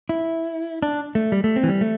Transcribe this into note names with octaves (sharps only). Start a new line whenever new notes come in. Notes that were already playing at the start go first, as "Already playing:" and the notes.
E4
D4
A3
G3
A3
C4
E3
G3
A3